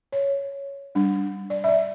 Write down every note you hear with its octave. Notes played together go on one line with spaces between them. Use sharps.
C#5
G3 D4
D5
E5
D5